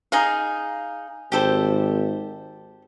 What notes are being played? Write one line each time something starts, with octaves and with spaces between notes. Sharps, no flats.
D#4 G#4 F5
G#1 G4 A4 C5